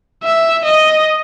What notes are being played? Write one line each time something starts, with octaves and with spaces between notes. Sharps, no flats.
E5
D#5